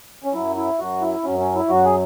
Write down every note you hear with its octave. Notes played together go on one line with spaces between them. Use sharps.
C#4
F#2 F#3 E4
E4
F#2 F#3 F#4
E4
F#2 F#3 C#4
C#4
E4
F#2 F#3 F#4
G#4